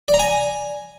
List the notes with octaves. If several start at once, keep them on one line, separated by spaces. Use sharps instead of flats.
D5
A#5
G#5